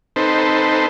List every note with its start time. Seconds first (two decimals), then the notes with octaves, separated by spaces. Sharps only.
0.16 C4 D#4 A4 B4 C5